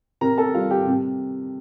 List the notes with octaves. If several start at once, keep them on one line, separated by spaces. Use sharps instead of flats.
C3 A#4 A#5
A4 A5
G3 F4 F5
G4 G5
C3